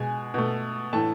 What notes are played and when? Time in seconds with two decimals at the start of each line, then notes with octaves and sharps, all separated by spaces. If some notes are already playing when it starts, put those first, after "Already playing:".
Already playing: B2 G#3 G#5
0.34 B2 A3
0.93 A2 E3 A3 A5